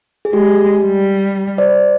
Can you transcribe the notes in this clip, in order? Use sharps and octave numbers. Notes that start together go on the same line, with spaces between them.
G#4
G#3 G4
G3
C5 D5